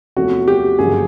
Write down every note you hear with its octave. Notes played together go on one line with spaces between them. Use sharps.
E2 C3 F3 A3 C#4 F#4
G4
G1 F#2 C#3 F3 A#3 G#4